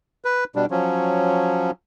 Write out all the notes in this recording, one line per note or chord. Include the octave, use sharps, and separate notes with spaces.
B4
B2 G3 D4
F3 F#3 C#4